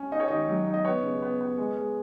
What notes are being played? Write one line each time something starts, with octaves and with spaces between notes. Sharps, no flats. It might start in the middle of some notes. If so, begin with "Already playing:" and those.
Already playing: C#4
D#4 D#5
C#5
D#3 D#5
F#3
D#4
D#5
B3 C#5
C#3
B3
B3
G#3
G#3